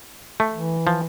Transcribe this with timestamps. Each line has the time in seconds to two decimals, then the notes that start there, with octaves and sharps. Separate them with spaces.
0.40 A3
0.54 E3
0.87 F3